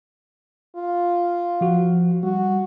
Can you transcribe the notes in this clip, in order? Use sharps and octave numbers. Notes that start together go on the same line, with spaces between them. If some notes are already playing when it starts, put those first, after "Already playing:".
F4
F3 F#4
G3 F#4